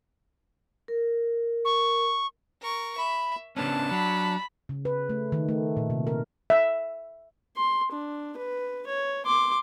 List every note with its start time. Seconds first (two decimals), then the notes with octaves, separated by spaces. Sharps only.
0.88 A#4
1.65 C#6
2.62 A#4 C#6
2.98 E5 B5
3.57 C#3 B3 C#4 D4 A5
3.91 F#3 B5
4.69 C#3
4.85 B4
5.09 A3
5.32 D#3
5.49 A3
5.77 A#2
5.90 C3
6.07 A#4
6.50 E5
7.57 C6
7.92 D4
8.37 B4
8.87 C#5
9.26 C6 D6